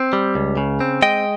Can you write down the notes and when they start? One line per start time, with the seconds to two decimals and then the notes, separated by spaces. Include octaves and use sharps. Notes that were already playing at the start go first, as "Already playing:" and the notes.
Already playing: C4
0.13 G3
0.35 C#2
0.57 C#3
0.80 C4
1.02 G#3 D#5 G5